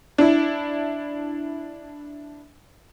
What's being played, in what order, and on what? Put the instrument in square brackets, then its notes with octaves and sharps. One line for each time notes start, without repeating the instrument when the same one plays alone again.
[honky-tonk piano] D4 E4